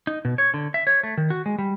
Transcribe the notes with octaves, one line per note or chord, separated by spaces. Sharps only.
D#4
B2
C#5
D3
E5
C#5
A3
D#3
F#4
G#3
G3